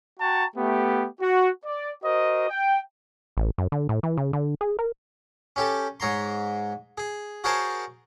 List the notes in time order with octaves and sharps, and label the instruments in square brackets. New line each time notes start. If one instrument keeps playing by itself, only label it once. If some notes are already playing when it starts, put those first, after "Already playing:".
[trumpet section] F#4 F#5 G5 A5 A#5 C#6
A3 B3 G4
F#4
D5
F#4 A#4 C5 D#5
G5
[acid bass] A1
F#2
D3
A2
E3
C#3
D3
G#4
A#4
[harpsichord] C#4 G4 A4
G#2 C#5 A#5 C6
G#4
F#4 G#4 A#4 C5 C#5 A5